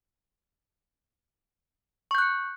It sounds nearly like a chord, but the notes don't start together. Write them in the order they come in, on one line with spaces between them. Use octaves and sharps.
C#6 G6 F#6 C#7